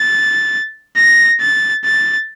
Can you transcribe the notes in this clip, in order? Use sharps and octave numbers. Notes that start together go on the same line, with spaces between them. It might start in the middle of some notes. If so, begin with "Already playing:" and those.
Already playing: A6
A#6
A6
A6